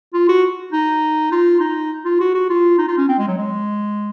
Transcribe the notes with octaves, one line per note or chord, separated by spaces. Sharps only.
F4
F#4
D#4
F4
D#4
F4
F#4
F#4
F4
D#4
F4
C#4
C4
G#3
F#3
G#3